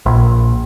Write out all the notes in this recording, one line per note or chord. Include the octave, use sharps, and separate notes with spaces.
A#1